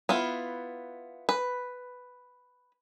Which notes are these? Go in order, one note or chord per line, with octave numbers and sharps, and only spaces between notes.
B3 E4 F4
B4